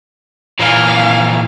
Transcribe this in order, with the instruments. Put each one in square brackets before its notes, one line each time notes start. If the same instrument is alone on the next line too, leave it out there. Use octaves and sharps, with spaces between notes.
[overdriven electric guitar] A#2 E3 [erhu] F5